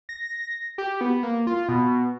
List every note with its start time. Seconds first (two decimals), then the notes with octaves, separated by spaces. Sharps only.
0.09 A#6
0.78 G4
1.01 B3
1.23 A#3
1.47 F4
1.69 B2